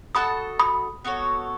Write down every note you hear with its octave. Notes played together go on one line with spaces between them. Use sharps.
F#4 A4 D#5 A5 B5 D#6
B5 D#6
B3 F#4 A4 C#5